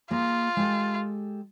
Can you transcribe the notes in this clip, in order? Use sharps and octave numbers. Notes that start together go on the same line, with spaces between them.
A#3 F4 G#4 D#5
G#3 G4 A4